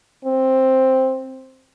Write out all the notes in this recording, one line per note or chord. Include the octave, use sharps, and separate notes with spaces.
C4